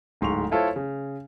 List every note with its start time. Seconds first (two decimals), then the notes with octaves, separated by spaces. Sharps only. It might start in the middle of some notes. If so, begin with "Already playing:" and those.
0.21 D1 G#2 C6 C#6 F7
0.51 E4 F4 A4 C5 C#5
0.76 C#3